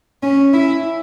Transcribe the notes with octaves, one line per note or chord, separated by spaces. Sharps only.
C#4
E4